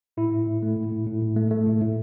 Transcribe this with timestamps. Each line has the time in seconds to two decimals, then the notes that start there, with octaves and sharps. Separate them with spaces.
0.17 A2 E4
0.32 A2
0.47 A2
0.63 A3
0.76 A2
0.92 A2
1.07 A2
1.22 A2
1.36 A3
1.51 A3
1.66 A2
1.81 A2